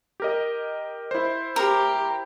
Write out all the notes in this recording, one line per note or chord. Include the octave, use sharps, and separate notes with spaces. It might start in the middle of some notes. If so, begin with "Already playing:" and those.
G4 A#4 D#5
E4 C5
G4 A#4